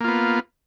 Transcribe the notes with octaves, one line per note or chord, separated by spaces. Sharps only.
A#3 B3 F4